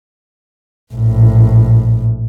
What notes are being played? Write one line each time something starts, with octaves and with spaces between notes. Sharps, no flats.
A#1 A2